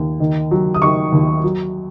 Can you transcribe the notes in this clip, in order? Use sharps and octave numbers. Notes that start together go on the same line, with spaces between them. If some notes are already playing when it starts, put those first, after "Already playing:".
Already playing: D#2
D#3
F#3
D#6
D#3 C#6
D#2
F#3